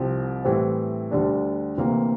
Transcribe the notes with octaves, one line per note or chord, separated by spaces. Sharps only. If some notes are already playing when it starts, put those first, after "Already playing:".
Already playing: C2 C3 F3
A2 E3 G3 C4
D2 D3 G3 D4
D2 C3 E3 A#3